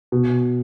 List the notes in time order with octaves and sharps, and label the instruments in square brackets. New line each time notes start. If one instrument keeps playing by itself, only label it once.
[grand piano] B2